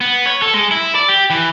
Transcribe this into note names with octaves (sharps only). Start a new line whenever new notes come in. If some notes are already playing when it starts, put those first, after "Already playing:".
B3
C#5
A4
G#3
E4
D5
G4
E3